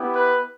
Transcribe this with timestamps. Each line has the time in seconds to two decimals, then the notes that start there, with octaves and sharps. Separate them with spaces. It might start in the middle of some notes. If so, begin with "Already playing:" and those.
Already playing: B3 E4 G4
0.15 B4